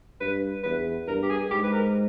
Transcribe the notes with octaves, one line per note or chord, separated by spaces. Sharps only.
G2 B4
E2 B4
G2 A#4
G4
G#4
G#2 G4
B4
A#4